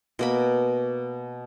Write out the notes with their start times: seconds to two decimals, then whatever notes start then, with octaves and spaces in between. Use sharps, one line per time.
0.19 B2 A#3 B5